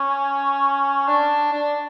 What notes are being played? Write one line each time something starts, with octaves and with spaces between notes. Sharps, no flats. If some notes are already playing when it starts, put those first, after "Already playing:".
Already playing: C#4
D4
D4